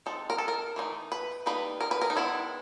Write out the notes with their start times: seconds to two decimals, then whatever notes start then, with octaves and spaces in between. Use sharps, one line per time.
0.06 G#3 C4 D#4 A4
0.30 A#4
0.38 A4
0.48 A#4
0.76 E3 A3 C4 D#4
1.12 B4
1.46 G3 A#3 D#4 B4
1.81 A#4
1.91 B4
2.02 A#4
2.10 D#4
2.16 D#3 G#3 B3 D4 E4